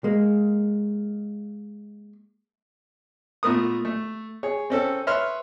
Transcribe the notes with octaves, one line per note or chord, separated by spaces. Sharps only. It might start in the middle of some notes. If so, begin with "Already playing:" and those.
G#3 A#3
A#2 A3 B3 A#4 D#6
A3
G#4 C#5
C4 C#4 A4
B4 C#5 E5 C6 F6